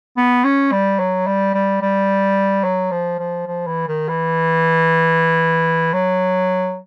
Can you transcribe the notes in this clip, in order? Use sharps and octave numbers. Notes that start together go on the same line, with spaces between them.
B3
C#4
G3
F#3
G3
G3
G3
F#3
F3
F3
F3
E3
D#3
E3
F#3